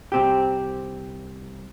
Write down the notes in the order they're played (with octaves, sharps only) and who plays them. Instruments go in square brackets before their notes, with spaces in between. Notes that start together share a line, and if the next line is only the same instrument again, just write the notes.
[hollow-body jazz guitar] C2 C4 G4